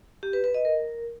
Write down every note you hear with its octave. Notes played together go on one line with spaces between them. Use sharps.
G4
B4
B4
D#5
A#4